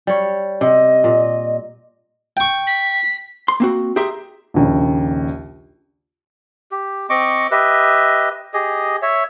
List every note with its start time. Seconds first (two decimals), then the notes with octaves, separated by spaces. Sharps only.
0.07 G3 C#5
0.61 C3 D#5
1.04 A#2
2.37 G5 C#6
2.67 B6
3.48 C6
3.60 A#3 C4 F#4
3.96 G4 G#4 A#4 E5 C6
4.54 A#1 D#2 C#3
6.71 G4
7.10 C4 D#5 C#6 D6
7.51 G4 B4 D#5 E5
8.54 G4 G#4 D#5
9.02 C#5 E5